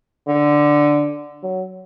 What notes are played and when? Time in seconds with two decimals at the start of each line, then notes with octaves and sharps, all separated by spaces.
0.28 D3
1.43 F#3